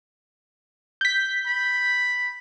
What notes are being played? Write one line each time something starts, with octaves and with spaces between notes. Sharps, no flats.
G6 B6
B5